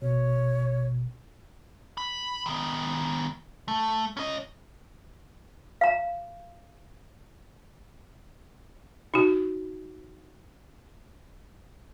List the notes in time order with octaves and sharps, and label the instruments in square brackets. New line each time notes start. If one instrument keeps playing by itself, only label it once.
[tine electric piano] G#1 B2 [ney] C#5
[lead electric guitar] B5
D#3 B3
A3
C#4 D#5
[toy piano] F5 A#5
[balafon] D#4 F#4